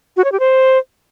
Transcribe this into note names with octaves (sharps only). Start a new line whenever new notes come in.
F#4
C#5
G4
C5